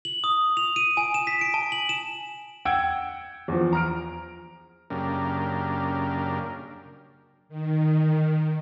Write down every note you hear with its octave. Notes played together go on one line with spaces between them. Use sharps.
F#7
D#6
F7
D#7
G#5
E7
B6
D7
A5
F#7
E7
F#5 G5 E6 G#6 D7
E2 F3
A#5 F6 D7
F#2 C#3 A#3 D4 G4 A#4
D#3